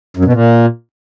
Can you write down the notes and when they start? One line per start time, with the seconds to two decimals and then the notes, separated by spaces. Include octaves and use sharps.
0.17 F#2
0.25 B2
0.33 A#2